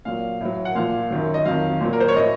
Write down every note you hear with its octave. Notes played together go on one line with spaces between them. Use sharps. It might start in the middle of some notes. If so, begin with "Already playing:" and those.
A#2 F#3 F5
A2 F#3
F#5
A#2 F3 F5
F#2 D#3 F#3
D#5
F2 D#3 F#3 F5
A#2 F#3
A#4
C5
C#5
A2 F#3 D#5